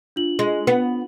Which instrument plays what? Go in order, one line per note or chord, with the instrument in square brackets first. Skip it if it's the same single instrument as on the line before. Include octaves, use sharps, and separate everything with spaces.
[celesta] D4 F4 F#7
[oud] G#3
B3